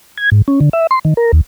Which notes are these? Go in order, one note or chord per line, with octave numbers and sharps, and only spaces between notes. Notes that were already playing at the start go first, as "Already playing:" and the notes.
G#6
G#2
C#4
D3
E5
C6
D#3
A#4
D#2